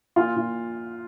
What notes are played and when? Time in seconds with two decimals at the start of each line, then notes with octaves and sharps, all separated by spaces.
0.16 A#2 F4
0.36 A#2